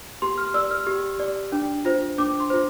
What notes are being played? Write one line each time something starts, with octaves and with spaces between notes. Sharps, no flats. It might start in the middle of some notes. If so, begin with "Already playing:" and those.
G4 C6
F6
D5 E6
F6
G4
D5
D4
F4 C5
D4 D6
C6
F4 C5